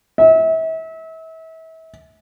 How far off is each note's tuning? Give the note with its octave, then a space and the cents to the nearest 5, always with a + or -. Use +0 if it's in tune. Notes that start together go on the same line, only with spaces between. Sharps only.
E5 -35